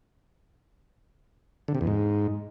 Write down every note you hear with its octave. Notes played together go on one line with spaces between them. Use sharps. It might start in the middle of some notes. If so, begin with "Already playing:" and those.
D3
C3
E2
G#2